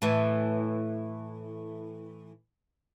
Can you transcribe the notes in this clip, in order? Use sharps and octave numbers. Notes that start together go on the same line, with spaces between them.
A2 E3